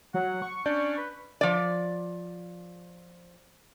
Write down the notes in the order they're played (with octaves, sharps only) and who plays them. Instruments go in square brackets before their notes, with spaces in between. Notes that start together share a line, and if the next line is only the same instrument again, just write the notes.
[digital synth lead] F#3 [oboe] F#5
[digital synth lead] C#6
[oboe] C#4 [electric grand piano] D4 D5 G6
[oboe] B4
[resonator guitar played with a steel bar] F3 D5